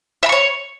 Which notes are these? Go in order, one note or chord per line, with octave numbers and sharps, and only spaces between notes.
C#5 E5 B5 C#6